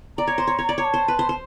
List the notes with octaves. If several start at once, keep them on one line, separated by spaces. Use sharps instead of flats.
D5 A#5
C#5
C5
C#5
C#5
D5
C#5 A#5
A5
C5
B4
C5
C5